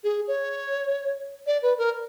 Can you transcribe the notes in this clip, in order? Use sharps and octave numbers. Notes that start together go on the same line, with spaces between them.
G#4
C#5
D5
B4
A#4